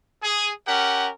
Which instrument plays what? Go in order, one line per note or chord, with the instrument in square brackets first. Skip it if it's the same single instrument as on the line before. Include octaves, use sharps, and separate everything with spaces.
[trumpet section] G#4
C#4 G4 A#4 F#5